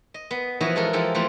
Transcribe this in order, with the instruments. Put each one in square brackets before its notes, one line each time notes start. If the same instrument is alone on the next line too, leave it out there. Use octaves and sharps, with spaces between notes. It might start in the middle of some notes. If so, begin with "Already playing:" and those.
[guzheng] D#5
B3
E3 F3 B3 F#4 C#5 D#5
G#3 F#4 A4 A#4
E3 F3 G#3 G4 A4
E3 F3 A3 A#3 C4 F4